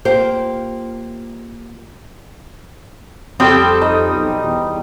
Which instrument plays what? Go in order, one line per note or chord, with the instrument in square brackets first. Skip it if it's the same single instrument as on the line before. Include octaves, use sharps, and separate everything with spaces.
[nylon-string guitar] A#3 F4 G4 C5
[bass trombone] F2 [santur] G3 G5 D#6 [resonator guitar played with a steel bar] C4 G4 A4
[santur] D#4 D#5
[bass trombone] B1
E2